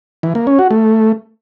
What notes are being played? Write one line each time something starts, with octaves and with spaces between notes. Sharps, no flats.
E3
A#3
C#4
F#4
A3